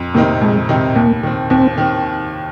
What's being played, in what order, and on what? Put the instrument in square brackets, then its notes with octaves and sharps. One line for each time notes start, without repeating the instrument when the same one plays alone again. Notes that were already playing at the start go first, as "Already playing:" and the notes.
Already playing: [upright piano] F2
[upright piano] C3 D#3 C4 D#4 [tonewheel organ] A#3
[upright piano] F2 [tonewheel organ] G#3
[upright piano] C3 D#3 C4 D#4
[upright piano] D#2 [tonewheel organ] A#3
[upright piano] D#3 C4
[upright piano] D#2 [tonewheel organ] C4
[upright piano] D#3 C4